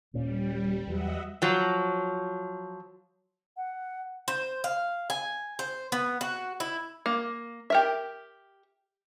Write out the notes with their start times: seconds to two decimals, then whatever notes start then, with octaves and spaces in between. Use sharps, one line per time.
0.14 D#1 A#2 G3 C#4
0.87 E2 F#3 D#5 E5 F#5
1.42 F3 F#3
3.57 F#5
4.28 C5
4.64 F5
5.10 G#5
5.59 C5
5.92 B3
6.21 F#4
6.60 E4
7.06 A#3
7.70 G4 A#4 E5